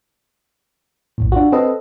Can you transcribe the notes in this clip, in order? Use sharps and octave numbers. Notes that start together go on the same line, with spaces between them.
A#1 F2 A2
D4 F4 F#4
C4 A4 B4 D#5